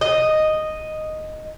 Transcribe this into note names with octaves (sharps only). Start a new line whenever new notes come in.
D#5